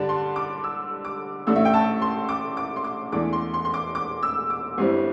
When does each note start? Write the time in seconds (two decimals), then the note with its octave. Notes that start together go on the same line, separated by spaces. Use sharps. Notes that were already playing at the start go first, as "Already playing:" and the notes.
Already playing: G2 D3 G3 D4 A5
0.09 C6
0.36 D6
0.64 E6
1.05 D6
1.47 A1 A2 A3 D4 E6
1.56 E5
1.65 G5
1.74 A5
2.02 C6
2.29 D6
2.57 D6
2.76 C6
2.84 D6
3.12 E2 E3 A3 D4 D6
3.33 C6
3.54 C6
3.65 C6
3.74 D6
3.95 D6
4.23 E6
4.50 D6
4.78 G1 G2 G3 C4 E4